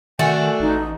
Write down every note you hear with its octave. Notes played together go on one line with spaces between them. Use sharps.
D#3 A3 D4 F#4 G#5
A1 D#4